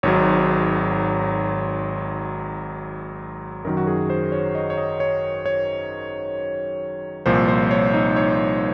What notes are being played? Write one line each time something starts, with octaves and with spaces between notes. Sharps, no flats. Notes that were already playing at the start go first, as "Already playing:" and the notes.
G#1 G#2 F#3 C#5
F#2 D#3 F#3 A#4
F#4
G#4
C5
C#5
D#5
C#5
D#5
C#5
C#5
C2 A#2 F3 C5
C5
C#5
D#4
C#5